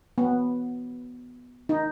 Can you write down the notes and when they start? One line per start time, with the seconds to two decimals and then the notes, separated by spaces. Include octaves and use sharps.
0.18 B3
1.69 D#4